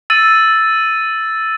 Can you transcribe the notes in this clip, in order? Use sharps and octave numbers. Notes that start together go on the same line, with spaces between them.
E6 A6 D#7